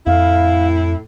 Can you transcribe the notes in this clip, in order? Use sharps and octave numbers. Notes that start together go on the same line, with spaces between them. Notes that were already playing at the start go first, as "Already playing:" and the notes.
F2 A2 E4 F5